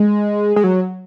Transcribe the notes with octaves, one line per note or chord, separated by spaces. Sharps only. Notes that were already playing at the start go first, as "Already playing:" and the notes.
Already playing: G#3
G#3
F#3